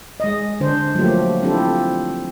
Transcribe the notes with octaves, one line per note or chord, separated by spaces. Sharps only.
G#3 D#5
D3 D4 C5
F3 F#3 A3 A#3 G4
C4 D4 E4 F4 G4 A4